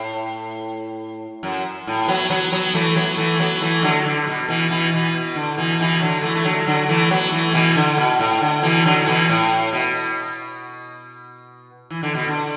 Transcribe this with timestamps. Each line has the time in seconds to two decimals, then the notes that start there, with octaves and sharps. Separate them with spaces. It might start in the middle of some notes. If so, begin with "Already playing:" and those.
Already playing: A2
1.43 F#2
1.87 A2
2.08 F#3 B3
2.30 F#3 B3
2.52 F#3 B3
2.74 E3 A3
2.96 F#3 B3
3.17 E3 A3
3.40 F#3 B3
3.61 E3 A3
3.83 D3 F#3
4.05 D3
4.27 B2
4.48 B2 E3
4.70 B2 E3
4.92 B2 E3
5.15 B2
5.35 D3
5.57 B2 E3
5.79 B2 E3
6.01 D3 F#3
6.23 E3 A3
6.35 A3
6.44 D3 F#3
6.66 D3 F#3
6.89 E3 A3
7.10 F#3 B3
7.32 E3 A3
7.54 B2 E3
7.76 D3
7.98 B2
8.19 A2
8.41 D3
8.63 B2 E3
8.85 D3 F#3
9.06 B2 E3
9.29 A2
9.73 B2
11.90 E3
12.03 D3
12.15 B2
12.27 D3